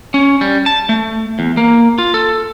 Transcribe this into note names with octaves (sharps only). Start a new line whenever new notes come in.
C#4
G3
A5
A3
E2
A#3
F4
A4